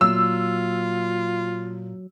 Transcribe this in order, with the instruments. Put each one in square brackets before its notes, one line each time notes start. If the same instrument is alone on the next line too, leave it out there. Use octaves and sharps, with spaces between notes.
[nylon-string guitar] A#2 [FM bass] F#3 [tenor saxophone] F4 [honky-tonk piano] E6